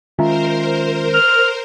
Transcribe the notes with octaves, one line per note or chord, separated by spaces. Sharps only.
D#3 G#3 C#4 F4 A#4 C5 E5 A#5
F6